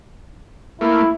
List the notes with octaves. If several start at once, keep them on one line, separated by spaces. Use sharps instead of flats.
A3 A#3 E4